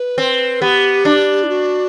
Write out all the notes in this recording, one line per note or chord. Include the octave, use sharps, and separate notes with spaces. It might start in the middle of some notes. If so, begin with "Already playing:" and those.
Already playing: B4
C4
B3 G4
D4
E4
F#4